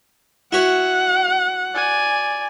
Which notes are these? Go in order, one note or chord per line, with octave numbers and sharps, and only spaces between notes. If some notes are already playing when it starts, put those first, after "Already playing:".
E4 F#4 C#5 F#5
D5 G#5